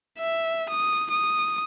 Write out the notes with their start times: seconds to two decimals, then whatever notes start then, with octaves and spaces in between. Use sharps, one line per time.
0.18 E5
0.70 D#6
1.11 D#6